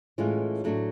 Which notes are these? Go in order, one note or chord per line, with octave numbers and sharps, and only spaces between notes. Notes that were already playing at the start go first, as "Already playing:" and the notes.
A2 E3 G#3 C#4 F4
A2 F#3 A3 D4 F#4